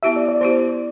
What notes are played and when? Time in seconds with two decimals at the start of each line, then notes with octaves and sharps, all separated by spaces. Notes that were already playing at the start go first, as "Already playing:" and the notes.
0.03 B3 E4 G4 E5
0.16 D5
0.29 D5
0.41 B3 E4 G4 C5